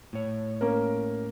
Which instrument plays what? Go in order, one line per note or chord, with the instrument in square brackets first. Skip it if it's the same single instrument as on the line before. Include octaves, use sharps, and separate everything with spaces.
[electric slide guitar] A2 C#5
[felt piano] A#3 C#4 A#4